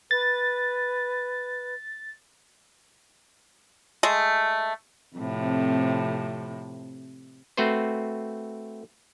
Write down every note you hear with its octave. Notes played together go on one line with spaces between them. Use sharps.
B4 A6
G#3 A3
F2 A2 C3
A3 C4 F#4 B4 C5